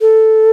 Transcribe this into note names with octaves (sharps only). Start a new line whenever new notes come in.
A4